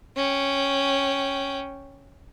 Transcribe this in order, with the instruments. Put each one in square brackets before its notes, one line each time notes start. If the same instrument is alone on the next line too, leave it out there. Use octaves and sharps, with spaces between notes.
[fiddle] C#4 G5